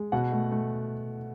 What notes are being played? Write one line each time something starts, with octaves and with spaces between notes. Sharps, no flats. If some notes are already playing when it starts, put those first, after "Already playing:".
Already playing: G#3
B2 F#5
A3
A3